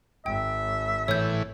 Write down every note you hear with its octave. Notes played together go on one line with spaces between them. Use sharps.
G#1 E5 G5
A2 E3 C#5 G6